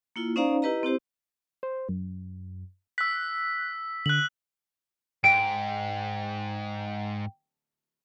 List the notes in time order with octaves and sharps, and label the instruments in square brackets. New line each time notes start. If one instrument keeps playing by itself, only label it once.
[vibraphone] A#3 E4 F4
C#4 D#4 C5 D5 F5 A#5
E4 G4 B4 D#5 A#5
C4 E4 G4 C5
[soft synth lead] C5
F#2
[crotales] E6 B6 [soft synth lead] F#6
[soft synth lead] D3 [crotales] F#6 F#7
[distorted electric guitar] G#2 [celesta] G5 [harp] D7